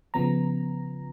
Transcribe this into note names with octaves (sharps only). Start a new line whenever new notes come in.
C#3 F3 B3 A#5